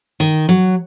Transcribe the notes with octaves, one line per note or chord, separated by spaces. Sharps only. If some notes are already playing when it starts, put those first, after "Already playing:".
D#3
F#3